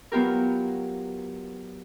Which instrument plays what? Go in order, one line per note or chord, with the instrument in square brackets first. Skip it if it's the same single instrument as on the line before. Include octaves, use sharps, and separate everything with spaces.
[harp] F#3 B3 F4 G4 A#4